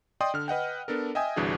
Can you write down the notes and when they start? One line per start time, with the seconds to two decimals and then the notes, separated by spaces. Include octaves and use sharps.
0.21 D5 D#5 G5 C6 D#6
0.34 D3 F6
0.48 B4 D#5 F#5 G5
0.88 B3 D4 A4 A#4
1.15 D#5 E5 G5 G#5 D#6
1.36 G1 C2 E3 D4 F#4 G#4